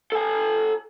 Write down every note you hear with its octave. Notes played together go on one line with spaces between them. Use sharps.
A4 G#5